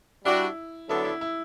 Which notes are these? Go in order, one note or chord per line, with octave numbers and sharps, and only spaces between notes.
G3 D4 E4 F#4
D3 F#3 B3 D4 E4 A4
E4
E4